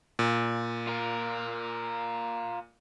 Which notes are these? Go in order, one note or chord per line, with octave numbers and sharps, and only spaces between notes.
A#2
F4 A#4